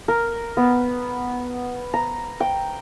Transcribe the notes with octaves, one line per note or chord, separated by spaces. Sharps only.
A#4
B3
A#5
G5